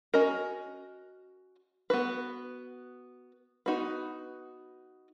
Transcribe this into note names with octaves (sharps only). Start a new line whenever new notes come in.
C#4 F#4 A#4 D#5
B3 F#4 B4
B3 D#4 F#4 B4